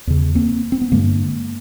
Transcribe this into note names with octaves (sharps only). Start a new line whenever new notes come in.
E2 C#3
A#3 C4
C4
B3
G2 D3 G#3 A#3